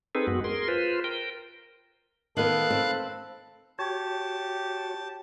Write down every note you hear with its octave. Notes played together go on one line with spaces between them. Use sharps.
C4 D#4 G#4 A4 B4
F#2 G#3 B3 F#4
G#4 A#4 C6
F4 B4 C5
A#4 G5
D#3 B3 A4 F5 B5 F#6
C4
F#4 G4 C#5 A5